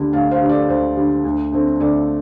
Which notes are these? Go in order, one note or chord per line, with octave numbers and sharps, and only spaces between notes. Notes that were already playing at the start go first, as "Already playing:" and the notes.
Already playing: D2 D3 G3
D2 F5 A5
C5 F5
D3 G3
A4 D5
D2 C5
D3 G3
D2
D3 A3 C4
D2 A4 D5